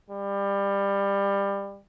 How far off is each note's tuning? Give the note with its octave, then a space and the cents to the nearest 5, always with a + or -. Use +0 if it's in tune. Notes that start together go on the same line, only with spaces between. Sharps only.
G3 +25